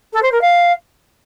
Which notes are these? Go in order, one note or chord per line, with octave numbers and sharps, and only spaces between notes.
A4
C5
A#4
F5